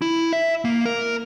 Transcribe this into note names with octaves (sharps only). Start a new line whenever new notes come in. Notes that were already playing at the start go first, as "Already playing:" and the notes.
E4
E5
A#3
A#4